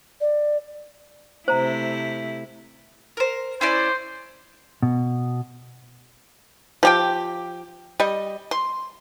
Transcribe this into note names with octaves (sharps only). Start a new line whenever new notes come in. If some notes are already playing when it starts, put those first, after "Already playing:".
D5
C3 A3 E4 C5 A#5
A#4 C5
C#4 E4 C5 D5
B2
F3 G4 G5
G3 D#5
C6